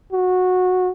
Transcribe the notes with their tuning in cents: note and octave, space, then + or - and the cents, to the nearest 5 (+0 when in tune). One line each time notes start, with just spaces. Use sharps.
F#4 -15